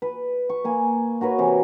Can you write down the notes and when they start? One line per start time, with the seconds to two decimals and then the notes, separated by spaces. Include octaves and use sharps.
0.02 B4
0.49 C#6
0.64 A#3 G#5
1.21 F#4 A#4 B4 C#5
1.38 C3 E3